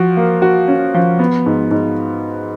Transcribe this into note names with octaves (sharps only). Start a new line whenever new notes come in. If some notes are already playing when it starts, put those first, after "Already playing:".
Already playing: F3 F#4
A#3
F#4
C#4
F3
B3
G#2
G#2